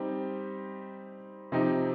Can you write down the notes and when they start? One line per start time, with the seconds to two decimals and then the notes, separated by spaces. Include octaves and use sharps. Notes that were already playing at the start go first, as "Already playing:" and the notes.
Already playing: G3 C4 D#4 G4
1.52 C3 F3 C4 D#4 G4